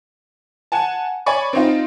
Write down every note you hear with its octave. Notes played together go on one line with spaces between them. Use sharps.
F#5 G#5 A5
C#5 D5 G#5 B5 C#6
C4 D#4 F4